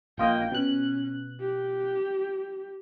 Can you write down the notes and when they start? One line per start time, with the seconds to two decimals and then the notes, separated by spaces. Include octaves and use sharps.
0.18 A#1 A#3 F4 D#5 G5
0.52 B2 C#4 F#6
1.40 G4